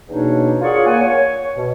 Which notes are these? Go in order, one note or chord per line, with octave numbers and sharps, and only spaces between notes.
E2 B2 A#3 D4 D#4 C#5
F4 G#4 A#4 C#5 D5 F#5
A#3 F#5 G#5
C#5
B2